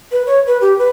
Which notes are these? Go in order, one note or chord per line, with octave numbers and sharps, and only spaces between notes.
B4
C#5
B4
G4
B4